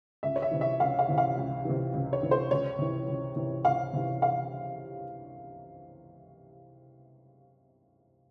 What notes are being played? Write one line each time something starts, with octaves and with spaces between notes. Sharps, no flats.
C#2 E5
C#5
E5
C3 E3
E5
C#2 F5
F5
C3 E3
F5
C#2
C3 E3
C#2
C#5
C3 E3
C5
C#2 C#5
C3 E3
C#2
C3 E3
C#2 F5
C3 E3
F5